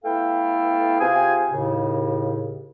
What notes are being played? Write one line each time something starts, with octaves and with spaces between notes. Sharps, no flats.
A3 B3 E4 A4 F5 G5
C3 F4 G#4 G5 G#5
D#2 A2 C#3